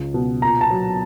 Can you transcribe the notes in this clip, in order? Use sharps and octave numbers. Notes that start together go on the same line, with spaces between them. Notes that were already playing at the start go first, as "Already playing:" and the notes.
Already playing: C#2 C#3
B2
A#2 A#5
A5
F#3